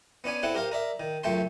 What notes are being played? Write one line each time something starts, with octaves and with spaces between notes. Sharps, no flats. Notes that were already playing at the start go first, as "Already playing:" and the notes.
B3 C#4 D4 G#5
C4 E4 A4 F#5
G4 A#4 C5 F5
A#4 D5 E5
D#3
C#2 F#2 A3 G5 A5 C6